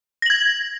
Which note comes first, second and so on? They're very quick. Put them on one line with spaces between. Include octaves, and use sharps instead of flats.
A#6 F#7 G#6